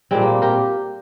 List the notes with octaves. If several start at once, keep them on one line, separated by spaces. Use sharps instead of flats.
A#2 G3 G#3 C4
A#3
G4 A#4